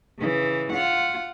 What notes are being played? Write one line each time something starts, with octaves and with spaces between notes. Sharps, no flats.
C#3 E3
F4 F#5